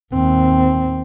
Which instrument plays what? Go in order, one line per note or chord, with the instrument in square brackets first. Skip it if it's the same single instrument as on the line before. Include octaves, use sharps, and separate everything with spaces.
[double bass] D#2 C4